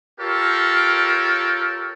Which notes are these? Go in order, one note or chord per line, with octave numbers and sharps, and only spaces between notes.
F4 G4 A4 A#4 C#5